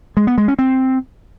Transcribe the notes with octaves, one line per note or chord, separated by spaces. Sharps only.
G#3
B3
G#3
C#4
C4